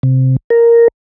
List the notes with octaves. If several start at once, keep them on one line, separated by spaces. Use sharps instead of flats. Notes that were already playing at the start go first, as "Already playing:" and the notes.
C3
A#4